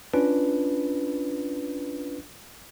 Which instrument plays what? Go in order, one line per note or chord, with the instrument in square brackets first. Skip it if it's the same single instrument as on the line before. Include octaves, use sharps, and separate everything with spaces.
[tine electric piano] C#4 D4 F4 B4